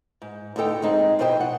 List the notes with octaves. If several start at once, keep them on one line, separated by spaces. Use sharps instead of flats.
G#2
D2 A2 D#4 A4 G5
G#2 G#3 C4 D#4
F2 B2 A4 C5 D#5 G5
F#5